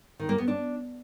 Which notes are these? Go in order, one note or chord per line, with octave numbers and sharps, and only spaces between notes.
D#3
A#3
B3
D4